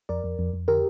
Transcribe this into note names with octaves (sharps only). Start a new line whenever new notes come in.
F2 A#4 D5
F2
F2
F2
D3 G4 A#4